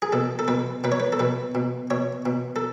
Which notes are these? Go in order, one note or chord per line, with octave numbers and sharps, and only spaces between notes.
G#4
B2 A4
A4
B2 B4
B2 B4
C#5
B4
A4
B2 B4
B2
B2 C#5
B2
A4